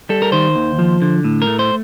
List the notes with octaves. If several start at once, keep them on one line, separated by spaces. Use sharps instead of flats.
G3 A4
A#4
D#3 C5
D#2
F3
D3
A2
A#4
A3
C5